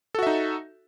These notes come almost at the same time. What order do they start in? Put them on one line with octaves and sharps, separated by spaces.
A4 F#4 E5 D#4